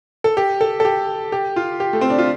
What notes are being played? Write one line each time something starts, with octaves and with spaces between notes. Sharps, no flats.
A4
G4
A4
A4
G4
G4
F4
G4
A3
C4
D4
F4